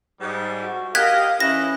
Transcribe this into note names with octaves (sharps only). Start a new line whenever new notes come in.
G#2 G3
F#4
G4 A#4 D#5 F5 F#6 G#6 B6
E3 C#4 E4 D#5 F#6 A#6